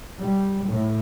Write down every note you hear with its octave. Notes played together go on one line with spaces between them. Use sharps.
G3
A2